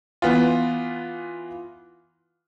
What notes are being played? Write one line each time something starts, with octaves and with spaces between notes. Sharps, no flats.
E3 B3 F4